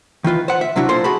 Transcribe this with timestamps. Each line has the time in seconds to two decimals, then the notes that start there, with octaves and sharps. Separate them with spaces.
0.24 D#3 E3 F4 B4
0.48 C5 F#5
0.61 E5
0.76 C3 F#3 D4 E4 F#4
0.89 A#2 A#3 F4 A4 C5 C6
1.04 F#4 G#4 A5 B5